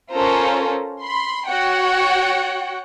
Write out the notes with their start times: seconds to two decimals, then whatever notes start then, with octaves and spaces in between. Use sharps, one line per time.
0.11 C#4 F4 A4 A#4 C5 A#5
1.01 B5 C6
1.47 F#4 C#5 F#5 G5